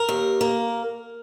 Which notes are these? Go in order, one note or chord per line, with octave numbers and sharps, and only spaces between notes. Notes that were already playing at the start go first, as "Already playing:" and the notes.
Already playing: A#4
D#2
A#3